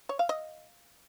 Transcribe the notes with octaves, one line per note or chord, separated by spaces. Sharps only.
C#5
F5
D#5